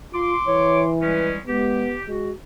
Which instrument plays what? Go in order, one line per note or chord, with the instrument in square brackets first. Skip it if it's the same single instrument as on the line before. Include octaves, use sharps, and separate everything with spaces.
[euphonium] F4 [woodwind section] C6 D6
[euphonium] E3 [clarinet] C#5
[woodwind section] G3 G#3 C#4 [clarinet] B4
[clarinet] G#3 [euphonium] B3 [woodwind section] G4
[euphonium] G#3 [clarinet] F#4